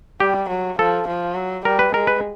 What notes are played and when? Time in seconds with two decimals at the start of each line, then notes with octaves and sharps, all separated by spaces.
0.20 G3 G4
0.49 F#3
0.79 F3 A4
1.08 F3
1.35 F#3
1.65 G3 A#4
1.79 B4
1.93 G#3 A#4
2.07 B4